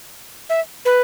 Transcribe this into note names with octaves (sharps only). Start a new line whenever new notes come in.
E5
B4